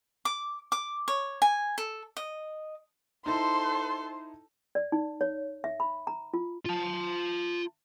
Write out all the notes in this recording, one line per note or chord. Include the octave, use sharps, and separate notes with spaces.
D6
D6
C#5
G#5
A4
D#5
D#4 E4 A4 C5 A5 C6
D5
D#4
C#5
E5
B5
A#5
F4
F4 A5